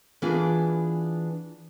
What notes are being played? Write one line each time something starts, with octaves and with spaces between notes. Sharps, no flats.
E3 B3 D4 F4 G#4